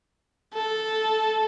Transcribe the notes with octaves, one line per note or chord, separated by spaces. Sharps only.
A4